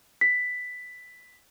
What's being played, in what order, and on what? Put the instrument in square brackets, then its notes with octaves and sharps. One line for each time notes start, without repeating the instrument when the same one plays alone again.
[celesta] B6